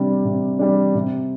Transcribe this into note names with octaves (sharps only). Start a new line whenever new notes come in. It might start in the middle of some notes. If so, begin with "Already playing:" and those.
Already playing: C3 G3 D4
C3
G3 D4
C3